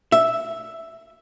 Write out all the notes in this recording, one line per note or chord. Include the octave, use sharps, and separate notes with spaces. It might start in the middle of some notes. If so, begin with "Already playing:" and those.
E5